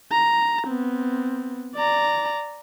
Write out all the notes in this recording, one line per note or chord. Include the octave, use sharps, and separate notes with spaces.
A#5
B3 C4
D5 A#5